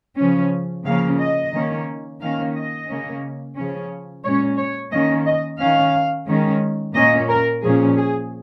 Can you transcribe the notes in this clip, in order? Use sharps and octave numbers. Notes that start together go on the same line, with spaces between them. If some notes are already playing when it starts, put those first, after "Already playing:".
C#3 F3 C#4
C#3 F3 A#3 C#4 F5
D#5
D#3 A#3 C#4
D#3 A#3 C#4 F5
D#5
C#3 A#3 C#4
C#3 F3 C#4
A#2 G#3 C#4 C#5
C#5
D#3 A#3 C#4 D#5
D#5
D#3 C#4 F5
D#3 G#3 C#4
A#2 A#3 C#4 D#5
A#4
A#2 F3 C#4 G#4
G#4